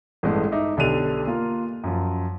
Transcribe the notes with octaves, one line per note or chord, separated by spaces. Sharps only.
A1 G2 G#3 A3
D#4 E5 D6
B1 D3 D4 G4 D#7 F7
A#3 F4 A#4
F#2 F3